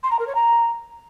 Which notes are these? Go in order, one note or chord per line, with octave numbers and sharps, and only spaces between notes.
C6
A#5
A#4
C#5
A#5